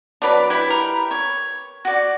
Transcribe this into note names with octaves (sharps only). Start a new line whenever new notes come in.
F#3 D4 B4 D5
E4 G4 B4
A#4
C#5
F#4 D5